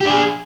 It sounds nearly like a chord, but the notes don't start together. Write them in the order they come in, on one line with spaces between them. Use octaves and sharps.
G4 D4 G#4